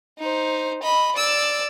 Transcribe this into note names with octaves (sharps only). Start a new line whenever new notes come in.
D#4 C5
D#5 B5
D5 E6